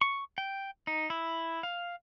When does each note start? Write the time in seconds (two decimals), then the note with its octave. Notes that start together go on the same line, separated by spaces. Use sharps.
0.01 C#6
0.38 G5
0.87 D#4
1.10 E4
1.63 F5